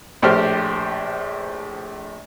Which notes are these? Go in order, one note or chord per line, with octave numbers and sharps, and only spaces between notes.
A#1 A2 G4 C5 F6